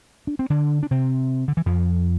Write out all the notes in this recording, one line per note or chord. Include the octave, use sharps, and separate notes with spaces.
D4
C4
D3 D4
D4
C3 C4
D3
E3
F2 F3